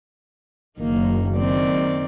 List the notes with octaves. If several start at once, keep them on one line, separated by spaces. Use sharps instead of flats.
F#1 D#3 A#3
D#3 C4 D5